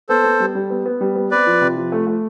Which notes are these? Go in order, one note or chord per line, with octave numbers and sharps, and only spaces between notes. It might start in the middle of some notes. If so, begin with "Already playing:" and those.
B3 A4 C5
B3
G3
G3
B3
B3
G3
B3
C4 B4 D5
F3
C3
F3
A3
A3